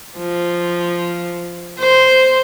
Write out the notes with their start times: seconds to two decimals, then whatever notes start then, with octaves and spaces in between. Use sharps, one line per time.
0.18 F3
1.79 C5